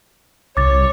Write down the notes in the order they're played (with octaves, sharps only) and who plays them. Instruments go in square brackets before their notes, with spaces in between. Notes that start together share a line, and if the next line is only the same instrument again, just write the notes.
[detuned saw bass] C2 [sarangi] C#5 [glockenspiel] D6 A6